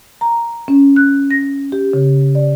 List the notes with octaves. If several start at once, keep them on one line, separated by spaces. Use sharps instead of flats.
A#5
C#4
F#6
A#6
G4
C#3
D5